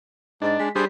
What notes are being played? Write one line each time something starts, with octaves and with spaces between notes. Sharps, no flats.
G#2 D4 D#5 A6
G#3 B6
G3 D4 G#4 C5